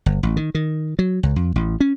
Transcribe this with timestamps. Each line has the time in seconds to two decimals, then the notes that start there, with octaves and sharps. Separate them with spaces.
0.06 G1
0.23 A1
0.37 D#3
0.55 D#3
0.99 F#3
1.23 C#2
1.36 F2
1.56 A1
1.80 C#4